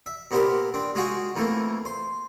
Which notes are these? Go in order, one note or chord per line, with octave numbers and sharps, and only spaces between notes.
E5
A#2 B3 C4 G4 A#4 B5
C4 D4
G#3 F4 F#4 G#4 G5 G#5
F2 E3 A3 A#3
C5